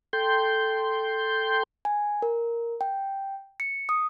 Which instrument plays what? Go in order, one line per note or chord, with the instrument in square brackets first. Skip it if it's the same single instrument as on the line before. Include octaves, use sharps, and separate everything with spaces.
[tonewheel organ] A4 G5 C6 G6
[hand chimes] G#5
A#4
G5
C#7
D#6